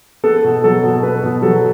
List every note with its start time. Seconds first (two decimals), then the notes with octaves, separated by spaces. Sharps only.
0.24 B3 A4
0.44 B2
0.64 F#3 A4
0.83 B2
1.03 B3 B4
1.23 B2
1.42 F#3 A4